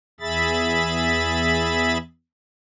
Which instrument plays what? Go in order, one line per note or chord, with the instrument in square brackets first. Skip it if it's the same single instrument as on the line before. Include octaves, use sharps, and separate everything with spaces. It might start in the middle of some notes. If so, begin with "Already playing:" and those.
[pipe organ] E2 G#4 E5 B5 A6